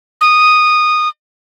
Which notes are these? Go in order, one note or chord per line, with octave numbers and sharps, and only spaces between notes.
D#6